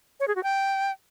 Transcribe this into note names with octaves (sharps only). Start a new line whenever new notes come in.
C#5
G#4
F#4
G5